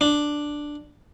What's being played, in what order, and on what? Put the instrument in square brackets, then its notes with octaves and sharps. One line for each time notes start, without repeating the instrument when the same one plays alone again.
[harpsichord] D4